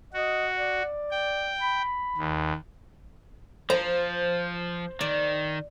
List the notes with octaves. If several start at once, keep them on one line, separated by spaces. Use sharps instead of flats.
F#4 D#5
D5
G5
B5
D#2
F3 C5 A#5
D#3 D5